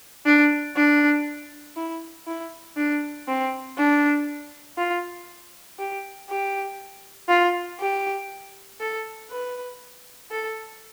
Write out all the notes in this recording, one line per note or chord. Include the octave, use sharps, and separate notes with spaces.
D4
D4
E4
E4
D4
C4
D4
F4
G4
G4
F4
G4
A4
B4
A4